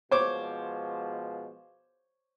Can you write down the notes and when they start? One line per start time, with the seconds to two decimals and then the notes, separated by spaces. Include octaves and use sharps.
0.11 B2 F3 G#3 C5 C#5 D6